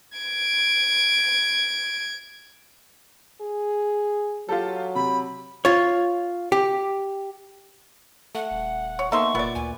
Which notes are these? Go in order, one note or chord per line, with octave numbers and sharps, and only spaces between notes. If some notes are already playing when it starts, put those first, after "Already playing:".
G#6 D7
G#4
F#3 F4 G4 A4
C3 B5
F4 C#5
G4
A3 F#5
D#1
C#5
A#3 B3 D#4 A4 E5 C6 C#6
F1 A#2 B3 D5
D2 G#5